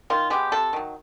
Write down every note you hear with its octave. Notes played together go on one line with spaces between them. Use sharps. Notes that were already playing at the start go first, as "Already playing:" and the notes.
D#3 F4
G#3 B3 G4
C3 A4
D#3 F#3